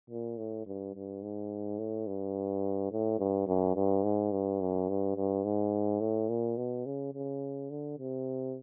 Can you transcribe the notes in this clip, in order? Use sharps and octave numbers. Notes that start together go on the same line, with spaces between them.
A#2
A2
G2
G2
G#2
A2
G2
A2
G2
F#2
G2
G#2
G2
F#2
G2
G2
G#2
A2
A#2
B2
C#3
C#3
D3
C3